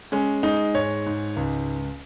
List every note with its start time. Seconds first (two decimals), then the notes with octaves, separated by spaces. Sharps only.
0.12 G#3 C#4
0.43 G#3 D#4
0.75 G#2 C#5
1.06 G#2
1.36 C#2